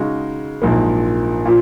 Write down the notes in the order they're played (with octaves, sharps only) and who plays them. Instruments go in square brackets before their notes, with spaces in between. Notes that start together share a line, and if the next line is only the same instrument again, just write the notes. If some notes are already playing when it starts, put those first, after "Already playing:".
Already playing: [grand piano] C#3 G#3 D#4 F#4
A#1 G#2 F#3 A#3
A#2 F3